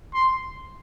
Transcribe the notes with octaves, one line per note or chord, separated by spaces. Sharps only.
C6